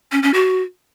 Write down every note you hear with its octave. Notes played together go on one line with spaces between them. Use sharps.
C#4
C#4
F#4